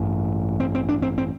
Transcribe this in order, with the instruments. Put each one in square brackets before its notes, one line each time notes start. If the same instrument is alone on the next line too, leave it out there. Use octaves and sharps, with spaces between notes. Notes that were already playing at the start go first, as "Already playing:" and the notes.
Already playing: [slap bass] A1 G2
C4
C4
D4
C4
C4